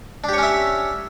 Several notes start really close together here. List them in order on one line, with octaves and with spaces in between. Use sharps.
D4 G4 C#5 C#4 E5